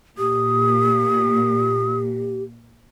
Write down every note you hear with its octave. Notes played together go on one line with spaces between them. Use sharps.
A#2 G4 D#6